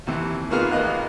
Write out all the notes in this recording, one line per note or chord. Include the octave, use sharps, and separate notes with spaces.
D#2 C3 E3
D#3 A#3 B3 F4 G#4 F6
A1 A#3 B3 D#5 F5 F#6